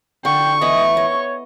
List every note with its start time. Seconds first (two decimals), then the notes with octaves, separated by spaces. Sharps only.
0.25 D3 G5 C#6
0.61 E3 B3 E4 D#5
0.97 C#5 D#5